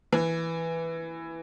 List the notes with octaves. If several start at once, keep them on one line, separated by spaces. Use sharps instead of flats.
E3